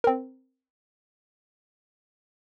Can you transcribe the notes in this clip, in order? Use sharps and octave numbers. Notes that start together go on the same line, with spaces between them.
C4 A#4